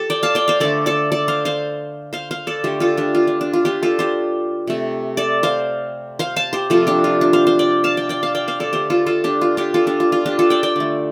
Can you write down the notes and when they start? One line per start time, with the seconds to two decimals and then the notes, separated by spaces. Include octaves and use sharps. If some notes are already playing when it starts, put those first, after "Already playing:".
Already playing: G4 A4
0.10 D5 G5
0.23 F5 A5
0.35 D5 G5
0.48 C5 F5
0.60 D3 A3 A4 D5
0.86 A4 D5
1.12 A4 D5
1.28 C5 F5
1.45 C5 F5
2.13 C5 F5
2.31 C5 F5
2.47 A4 D5
2.64 D3 A3 G4 C5
2.80 F4 A4
2.97 D4 G4
3.15 F4
3.27 D4
3.41 D4
3.53 F4
3.65 D4 G4
3.83 F4 A4
3.99 G4 C5
4.67 C3 A3
5.17 A4 D5
5.43 C5 F5
6.19 C5 F5
6.36 F5 A5
6.53 G4 C5
6.70 C3 F3 A3 F4 A4
6.87 D4 G4
7.04 F4
7.21 D4
7.33 C5 F5
7.47 C5 F5
7.59 D5 G5
7.84 F5 A5
7.97 D5 G5
8.09 D5 G5
8.23 F5 A5
8.35 D5 G5
8.48 C5 F5
8.60 A4 D5
8.73 D3 A3 G4 C5
8.90 F4 A4
9.06 F4 A4
9.24 D4 G4
9.41 F4
9.57 D4 G4
9.74 F4 A4
9.87 D4 G4
10.00 F4
10.12 F4
10.26 D4 G4
10.39 F4 A4
10.50 D5 G5
10.63 D5 G5
10.76 D3 A3